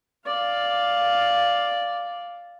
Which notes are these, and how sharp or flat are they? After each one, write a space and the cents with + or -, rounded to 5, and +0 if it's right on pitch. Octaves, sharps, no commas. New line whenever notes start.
D5 +0 F5 +0